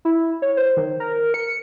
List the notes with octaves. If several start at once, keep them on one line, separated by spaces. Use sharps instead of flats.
E4
C#5
C5
D#3
A#4
C#7